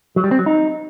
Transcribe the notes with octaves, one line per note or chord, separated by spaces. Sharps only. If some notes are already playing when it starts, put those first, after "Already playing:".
F#3
G3
C4
F#3
D#4